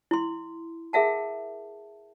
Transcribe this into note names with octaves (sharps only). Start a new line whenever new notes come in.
E4 C6
G#4 A#4 E5 F#5 A5